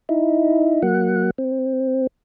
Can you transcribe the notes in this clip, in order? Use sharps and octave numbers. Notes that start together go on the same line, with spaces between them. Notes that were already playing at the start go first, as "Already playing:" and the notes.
D#4 E4
F#3 A#3 F#5
C4